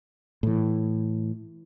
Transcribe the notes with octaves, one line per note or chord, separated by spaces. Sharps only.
A2 E3